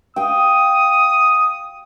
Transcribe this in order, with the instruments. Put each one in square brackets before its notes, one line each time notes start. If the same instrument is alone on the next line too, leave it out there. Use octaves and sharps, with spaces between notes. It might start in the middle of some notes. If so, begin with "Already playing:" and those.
[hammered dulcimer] F5 G5 [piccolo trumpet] D#6